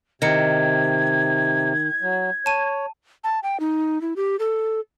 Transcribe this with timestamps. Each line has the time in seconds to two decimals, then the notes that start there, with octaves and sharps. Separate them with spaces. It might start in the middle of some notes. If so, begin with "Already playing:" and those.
0.22 C3 D#3 D#5 G#6 C#7
2.02 F#3
2.46 C#5 A5 D#7
3.24 A5
3.43 G5
3.60 D#4
4.01 E4
4.16 G4
4.39 A4